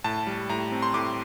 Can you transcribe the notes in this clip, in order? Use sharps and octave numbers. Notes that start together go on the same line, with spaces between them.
A2 A5
G3
A2 A#5
C4
C6
A2 D6